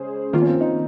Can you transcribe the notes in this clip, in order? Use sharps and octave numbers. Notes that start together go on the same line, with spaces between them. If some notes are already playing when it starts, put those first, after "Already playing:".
Already playing: C#3 G#3 C#4 G#4 C5
D#3 F3 A#3 F4
C#4
C4
D#4